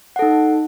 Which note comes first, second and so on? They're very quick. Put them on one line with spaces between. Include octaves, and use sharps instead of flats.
F#5 A4 D#4